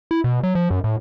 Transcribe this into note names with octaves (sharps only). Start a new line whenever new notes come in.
E4
B2
F#3
F3
F#2
A2